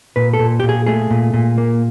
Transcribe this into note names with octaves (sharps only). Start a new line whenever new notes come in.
A#2 B4
A4
A#2
A#2 G4
G#4
A3 G#4
A#2
A#2
A#3